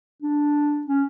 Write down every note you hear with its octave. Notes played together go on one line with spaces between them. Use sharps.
D4
C#4